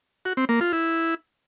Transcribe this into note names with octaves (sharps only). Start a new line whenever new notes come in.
F#4
C4
A#3
F4
E4